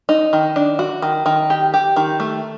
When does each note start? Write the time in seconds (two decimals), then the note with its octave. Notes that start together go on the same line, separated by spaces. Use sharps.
0.09 D#4
0.33 D#3
0.56 D4
0.79 F#4
1.02 D#3
1.26 D#3
1.50 G4
1.74 G4
1.96 D#3
2.20 A3